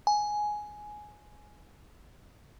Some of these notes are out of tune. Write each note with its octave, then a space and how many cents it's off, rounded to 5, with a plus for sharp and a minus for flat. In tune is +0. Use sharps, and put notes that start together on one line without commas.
G#5 +10